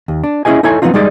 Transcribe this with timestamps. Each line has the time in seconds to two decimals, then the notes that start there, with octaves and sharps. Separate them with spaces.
0.08 D#2
0.24 D4
0.45 C#4 E4 G#4 D#5 G#5
0.63 D#4 E4 A4 C#5 G#5
0.82 F3 G#3 B3 C4 D#4 F4
0.94 G3 G#3 D#4 G#4 D5 D#5